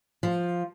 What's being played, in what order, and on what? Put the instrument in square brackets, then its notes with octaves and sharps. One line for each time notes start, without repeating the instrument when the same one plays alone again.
[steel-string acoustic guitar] F3